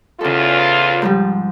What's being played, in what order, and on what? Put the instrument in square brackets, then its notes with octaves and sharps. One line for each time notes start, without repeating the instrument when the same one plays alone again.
[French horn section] E2 F4 [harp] C#3 A4
[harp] G#2 F3 G3